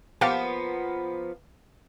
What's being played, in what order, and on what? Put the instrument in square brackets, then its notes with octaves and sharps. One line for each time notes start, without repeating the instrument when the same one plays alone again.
[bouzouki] F3 A#3 B3 [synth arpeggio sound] G4 F5 A5